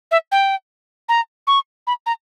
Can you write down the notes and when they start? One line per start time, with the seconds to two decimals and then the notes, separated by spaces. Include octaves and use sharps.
0.11 E5
0.32 G5
1.09 A#5
1.47 C#6
1.87 B5
2.06 A#5